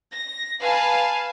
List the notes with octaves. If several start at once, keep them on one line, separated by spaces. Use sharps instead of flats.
A#6
B4 F5 G#5 A5